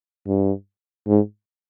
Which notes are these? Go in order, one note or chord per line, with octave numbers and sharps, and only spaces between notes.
G2
G#2